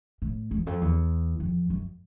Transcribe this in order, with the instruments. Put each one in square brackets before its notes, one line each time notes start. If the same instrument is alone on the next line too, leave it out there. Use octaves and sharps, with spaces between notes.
[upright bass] A2
E2
F2
E2
F2
F#2